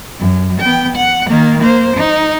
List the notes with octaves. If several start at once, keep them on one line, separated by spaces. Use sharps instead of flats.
F#2
B3 G5
F#5
D#3 A#3
A#3 C5
D#4